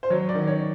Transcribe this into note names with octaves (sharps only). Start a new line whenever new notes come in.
C5
F#3 C#5
D5
D#3
C#5